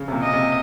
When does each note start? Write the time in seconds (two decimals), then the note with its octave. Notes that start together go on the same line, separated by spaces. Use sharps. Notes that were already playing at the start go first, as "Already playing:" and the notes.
Already playing: C#3
0.08 C3
0.12 A#2
0.23 D#5
0.33 C3